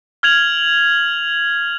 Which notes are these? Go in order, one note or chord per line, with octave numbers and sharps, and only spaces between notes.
F6 G#6 F7 F#7